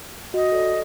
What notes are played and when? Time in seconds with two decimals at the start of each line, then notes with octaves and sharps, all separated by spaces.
0.34 F#4 D#5
0.52 A4 D5